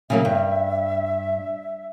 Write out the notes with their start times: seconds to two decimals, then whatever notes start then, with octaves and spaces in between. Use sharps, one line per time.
0.10 C#3 F#3 A#3 E5
0.25 G2